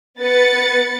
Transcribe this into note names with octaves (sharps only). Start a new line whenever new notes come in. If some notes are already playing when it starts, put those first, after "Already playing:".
B3 B4 A6 C#7